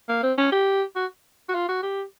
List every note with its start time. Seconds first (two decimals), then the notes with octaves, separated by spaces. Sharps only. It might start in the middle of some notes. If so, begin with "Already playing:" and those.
0.09 A#3
0.23 C4
0.38 C#4
0.52 G4
0.95 F#4
1.49 F#4
1.54 F4
1.69 F#4
1.83 G4